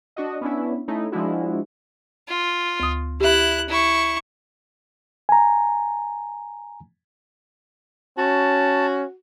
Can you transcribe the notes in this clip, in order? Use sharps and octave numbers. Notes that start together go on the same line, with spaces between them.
D4 F#4 D#5
B3 C#4 D4 E4
A3 C#4 D#4 E4
F3 G#3 D4 E4 F#4
F4
D2 D#6
E4 G4 E5 F#6
E4 C#6
G#5 A#5
C#4 F#4 A5